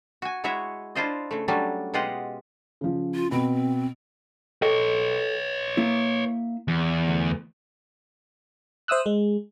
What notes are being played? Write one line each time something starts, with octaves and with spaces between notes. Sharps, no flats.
F#4 G#5
G#3 E4 F#4 C#5 E5
D4 E4 F4 C5 D#5
C#3 A3
F#3 G3 A3 C#4 D4
B2 G#3 F4 G4 D#5 F#5
C#3 F3
F4
B2 C4 B5
A4 B4 C#5 D#5 G5
A#3 E4
E2
D2
C5 E5 D#6 E6 F#6
G#3